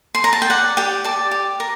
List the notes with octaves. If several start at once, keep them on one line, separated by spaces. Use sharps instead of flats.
C6
A#5
A5
G5
D5 F#5
G4 G5
D5 A5
G4
A#4